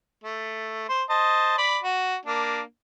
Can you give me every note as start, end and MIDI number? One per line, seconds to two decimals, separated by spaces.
0.24 0.84 57
0.89 1.03 72
1.10 1.58 72
1.10 1.58 75
1.10 1.58 81
1.58 1.78 74
1.58 1.78 83
1.83 2.16 66
2.26 2.61 58
2.26 2.61 62